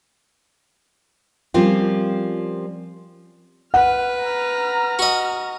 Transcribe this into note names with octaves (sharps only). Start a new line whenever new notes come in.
F3 G3 A#3 C4 C#4 F4
B4 F#5 F6
A#5 F6
F#4 D#5